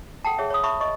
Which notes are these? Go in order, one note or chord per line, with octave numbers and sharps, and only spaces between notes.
A4 F#5 G5 A5
G#4 C#5 E5 A5
C#5 B5 D#6
E5 A5 B5 C#6
D#5 C#6